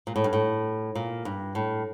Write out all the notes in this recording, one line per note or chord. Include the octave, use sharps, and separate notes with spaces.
A#2
A2
G2
A2
A#2
G2
A2